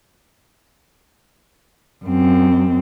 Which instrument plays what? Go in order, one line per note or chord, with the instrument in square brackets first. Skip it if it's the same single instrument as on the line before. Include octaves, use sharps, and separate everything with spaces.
[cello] F#2 C4